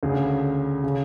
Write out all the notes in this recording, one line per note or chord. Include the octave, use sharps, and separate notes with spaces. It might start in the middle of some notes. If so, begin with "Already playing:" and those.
D2 C#3 G#4
C#3